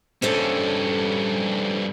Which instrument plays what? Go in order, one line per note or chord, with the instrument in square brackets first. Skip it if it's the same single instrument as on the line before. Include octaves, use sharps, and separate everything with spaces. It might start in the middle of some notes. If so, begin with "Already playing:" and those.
[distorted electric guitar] G2 C#4 [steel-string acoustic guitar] A4 C5 C#5